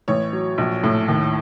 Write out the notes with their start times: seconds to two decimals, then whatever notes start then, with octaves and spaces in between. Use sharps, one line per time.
0.08 A1 C#5
0.33 F#3
0.58 A#1
0.84 A2
1.08 D#2